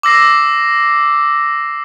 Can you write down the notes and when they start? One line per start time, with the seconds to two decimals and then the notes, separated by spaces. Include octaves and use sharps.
0.03 D6 E6 A#6 C7